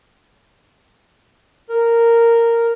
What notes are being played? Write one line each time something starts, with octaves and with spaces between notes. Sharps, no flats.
A#4